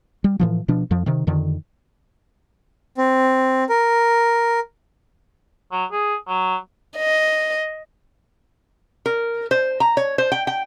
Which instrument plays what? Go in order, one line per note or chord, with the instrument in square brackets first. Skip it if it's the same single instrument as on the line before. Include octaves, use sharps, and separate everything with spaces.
[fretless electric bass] G3
A2 E3 F3
B2 F3 D4
F2 F3
C3 D#3
F2 D3 D#3
[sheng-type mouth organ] C4
A#4
[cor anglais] F#3
G#4
F#3
[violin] D#5
[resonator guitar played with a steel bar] A#4
C5
A#5
C#5
C5
G5
G5